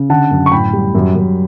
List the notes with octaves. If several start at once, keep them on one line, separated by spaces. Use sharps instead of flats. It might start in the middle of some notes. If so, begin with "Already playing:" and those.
Already playing: C#3
D3 F#5 A5
F#2
C#6
A2 G5 B5
G3
F#2
F#2